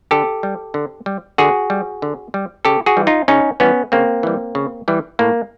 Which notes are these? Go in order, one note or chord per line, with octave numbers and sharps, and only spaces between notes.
D3 G4 A4
G3
D3
G3
D3 F#4 G#4
G3
D3
G3
C#3 G4 A4
F#4 G#4
E3 G3
D#4 F4
C#3 C#4 D#4
E3 G3 B3 C#4
C#3 A#3 C4
E3 G3
C#3
E3 G3
A2 A#3